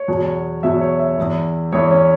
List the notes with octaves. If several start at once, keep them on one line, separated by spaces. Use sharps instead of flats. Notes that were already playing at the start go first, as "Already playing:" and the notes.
Already playing: C#5
E2 B2 F#3
E2 B2 F#3 E5
C#5
E5
E2 E3
E2 E3 C#5
C#4